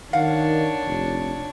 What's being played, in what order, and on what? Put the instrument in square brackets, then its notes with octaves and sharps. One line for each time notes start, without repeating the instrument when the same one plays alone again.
[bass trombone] D#3 [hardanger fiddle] D4 C#5 [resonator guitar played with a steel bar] F5 F#5
[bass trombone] F1